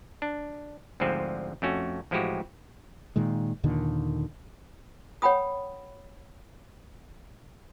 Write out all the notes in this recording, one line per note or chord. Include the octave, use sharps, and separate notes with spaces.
D4
D2 G#2 D3 F3 C4
F2 A3 C#4 F#4
A1 F3 G#3 E4 F#4 G4
A#2 D#3 G#3
D#2 A#2 D3 D#3
C#5 F#5 G5 B5 D#6